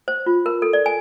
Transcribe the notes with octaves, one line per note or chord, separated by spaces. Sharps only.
C5
F4
A#4
A4
D5
G#5